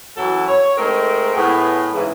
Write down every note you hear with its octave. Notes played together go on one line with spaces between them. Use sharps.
F#2 E3 F#3 E4 F#4 A4
C#5
G#3 A3 C4 D#4 A4 A#4
A2 B3 G#4
G#2 C#3 E3